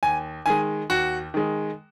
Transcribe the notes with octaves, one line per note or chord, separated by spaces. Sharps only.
D#2 G#5
D#3 G#3 G#5
D#2 F#4
D#3 G#3